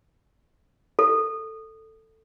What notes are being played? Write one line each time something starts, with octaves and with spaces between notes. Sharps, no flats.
A4